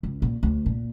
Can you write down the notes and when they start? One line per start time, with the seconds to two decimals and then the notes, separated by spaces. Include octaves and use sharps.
0.03 C#2
0.22 A#2
0.43 D2
0.66 A#2